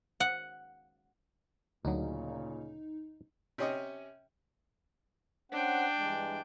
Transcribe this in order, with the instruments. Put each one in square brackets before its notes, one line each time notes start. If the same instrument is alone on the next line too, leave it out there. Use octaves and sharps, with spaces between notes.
[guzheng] F#5
[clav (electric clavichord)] D2 F#3 [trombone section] A#2 C#3 [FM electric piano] D#4
[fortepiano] C3 C#4 D#5
[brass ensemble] C#4 C5 F#5 [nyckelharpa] D4 G5
[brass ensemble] G2 E3 G#3